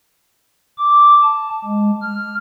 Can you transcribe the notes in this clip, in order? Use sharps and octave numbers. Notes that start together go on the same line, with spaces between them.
D6
A5
G#3
F6